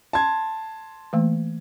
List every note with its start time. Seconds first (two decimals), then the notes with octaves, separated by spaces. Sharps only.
0.13 A5 C6 G#6
1.13 E3 A3 A#3